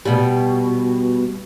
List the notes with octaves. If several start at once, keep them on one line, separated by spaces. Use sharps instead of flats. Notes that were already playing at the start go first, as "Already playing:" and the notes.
B2 G3